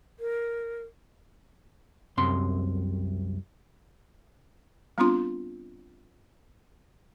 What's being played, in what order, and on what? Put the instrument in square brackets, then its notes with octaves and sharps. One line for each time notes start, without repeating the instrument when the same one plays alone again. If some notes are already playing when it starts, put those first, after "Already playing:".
[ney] A#4
[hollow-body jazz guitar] C2 F#2 C3 C6
[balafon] G3 B3 C4 D4 F4 C6